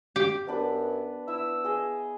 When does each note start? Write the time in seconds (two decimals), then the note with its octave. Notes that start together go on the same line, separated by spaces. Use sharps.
0.16 G4
0.47 F#2 B3 D4 B4
1.28 E4 E6
1.64 G#4 D#5